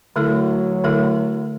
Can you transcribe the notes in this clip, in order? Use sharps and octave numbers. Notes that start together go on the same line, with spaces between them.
D3 F#3 A3 E4 A4
D3 A3 E4 A4